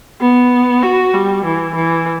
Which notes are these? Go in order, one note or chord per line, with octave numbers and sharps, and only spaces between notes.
B3
F#4
G3
E3
E3